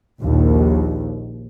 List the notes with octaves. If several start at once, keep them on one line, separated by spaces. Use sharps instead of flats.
A#1 D#2